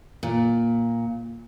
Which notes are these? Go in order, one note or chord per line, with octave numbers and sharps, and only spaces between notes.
A#2